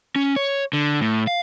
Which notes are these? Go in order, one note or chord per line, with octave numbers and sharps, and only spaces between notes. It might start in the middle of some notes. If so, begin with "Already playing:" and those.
C#4
C#5
D3
A2
F5